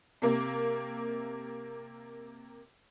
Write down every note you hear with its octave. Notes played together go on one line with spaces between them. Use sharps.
C3 A#3